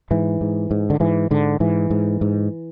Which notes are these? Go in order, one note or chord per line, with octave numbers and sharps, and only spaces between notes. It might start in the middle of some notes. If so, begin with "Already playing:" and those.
G#2 E3
G#2
G#2
D3
G#2 E3
G#2 D3
G#2 E3
G#2
G#2